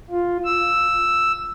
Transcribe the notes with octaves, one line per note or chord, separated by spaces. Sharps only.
F4
E6